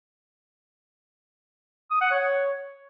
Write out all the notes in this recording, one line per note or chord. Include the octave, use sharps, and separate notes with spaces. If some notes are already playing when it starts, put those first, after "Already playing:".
D#6
F#5
C#5